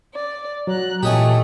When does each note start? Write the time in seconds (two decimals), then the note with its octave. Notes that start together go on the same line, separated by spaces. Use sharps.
0.13 D5
0.67 F#3 A#5 F#6
1.03 A#2 E3 A3 G4 C#5 D#5 G#5